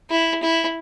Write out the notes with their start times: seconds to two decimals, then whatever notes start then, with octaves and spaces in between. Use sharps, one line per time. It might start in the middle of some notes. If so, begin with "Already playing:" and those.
0.11 E4
0.43 E4